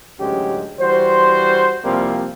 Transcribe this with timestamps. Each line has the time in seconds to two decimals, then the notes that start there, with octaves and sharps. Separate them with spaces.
0.20 A1 D2 F#3 G#3 C#4 G4
0.80 E3 G3 F#4 C5
1.84 C2 C3 F3 G3 A#3 C4